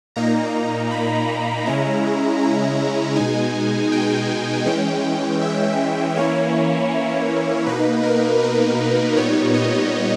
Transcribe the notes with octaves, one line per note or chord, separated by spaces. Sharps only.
A#2 A#3 D#4 A#5
B5
C#3 G#3 C#4 E4 A#5
A#5
B2 G#3 D#4 G#5
G5
E3 G#3 C#4 G5
E5
E3 A#3 C#4 E4 C#5
B2 A#3 D#4 B4
A#4
B4
A#2 G3 B3 D#4 C#5
D#5